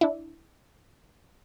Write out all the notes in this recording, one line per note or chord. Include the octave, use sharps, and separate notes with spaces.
D4 E4